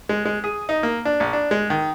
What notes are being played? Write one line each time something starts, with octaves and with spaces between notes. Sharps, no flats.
G#3
G#3
G#4
D#4
A#3
D4
A#1
D4
G#3
D#3